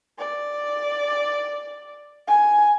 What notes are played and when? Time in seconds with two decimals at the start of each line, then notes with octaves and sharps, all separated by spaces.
0.18 D5
2.27 G#5